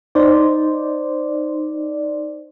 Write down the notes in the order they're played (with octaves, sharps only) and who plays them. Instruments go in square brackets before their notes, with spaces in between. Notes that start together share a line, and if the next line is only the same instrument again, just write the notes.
[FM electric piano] D#4 C5 D5